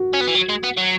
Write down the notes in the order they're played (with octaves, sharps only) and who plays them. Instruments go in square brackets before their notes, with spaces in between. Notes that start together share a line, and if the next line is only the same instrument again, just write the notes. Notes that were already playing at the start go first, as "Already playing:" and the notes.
Already playing: [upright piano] F#4
[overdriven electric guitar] C#4
B3
E3
F#3
G#3
B3
F#3